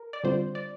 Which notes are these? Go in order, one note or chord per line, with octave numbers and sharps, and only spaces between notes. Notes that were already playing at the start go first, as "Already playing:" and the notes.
Already playing: A#4
D5
D3 G3 C4 F4 C5
D5